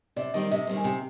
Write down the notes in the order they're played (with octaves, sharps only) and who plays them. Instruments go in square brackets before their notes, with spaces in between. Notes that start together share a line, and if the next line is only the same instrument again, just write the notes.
[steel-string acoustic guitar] C3 [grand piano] D5
[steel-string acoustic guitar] D#3 G3 C4 [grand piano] D#5
[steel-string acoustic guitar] C3 [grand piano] D#5
[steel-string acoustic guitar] D#3 G3 C4
[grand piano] G#5
[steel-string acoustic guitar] C3 [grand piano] G5